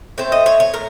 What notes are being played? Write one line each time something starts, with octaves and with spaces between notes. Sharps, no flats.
A2 A3 C4 C5
D#5
C#5
C#5
A2 A#4